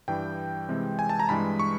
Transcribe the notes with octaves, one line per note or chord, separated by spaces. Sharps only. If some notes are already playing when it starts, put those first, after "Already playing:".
G2 E3 G3 G5
C3 E3 G#3 C4
G#5
A5
A#5
G2 E3 G#3 B5
C#6